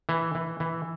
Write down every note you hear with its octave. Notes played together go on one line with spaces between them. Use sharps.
E3
E3
E3